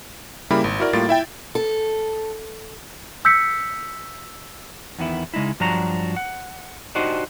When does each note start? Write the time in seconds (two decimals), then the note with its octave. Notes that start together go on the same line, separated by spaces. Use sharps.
0.50 C#3 G3 A#3 E4 B5
0.64 G#1
0.80 E4 F#4 A#4 D5
0.93 A2 G3 A#3 F4 A6 D7
1.09 E4 E5 G5
1.55 A4
3.25 E6 G6 B6 C#7
4.98 E2 D#3 B3 E4
5.34 C#3 G#3 D#4 E4
5.60 G2 F3 F#3 D4 F#4 A#5
6.16 F#5
6.95 D4 D#4 F#4 G4 C5 D#5